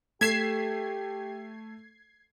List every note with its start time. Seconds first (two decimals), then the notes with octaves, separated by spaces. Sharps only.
0.21 A3 G4 A4 G#6 B6 C7 E7